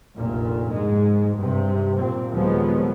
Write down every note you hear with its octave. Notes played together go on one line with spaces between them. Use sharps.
F1 A#1 A#2
G#2 G#3
G2 C3
A#2 C4
D#2 A#2 F3 F#3 G#3 B3